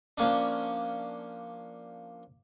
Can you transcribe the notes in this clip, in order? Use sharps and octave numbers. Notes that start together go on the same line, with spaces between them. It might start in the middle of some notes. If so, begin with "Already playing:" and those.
F3 A#3 C#4 D4